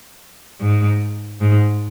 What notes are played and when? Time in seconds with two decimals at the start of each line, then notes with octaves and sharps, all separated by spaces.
0.61 G#2
1.40 G#2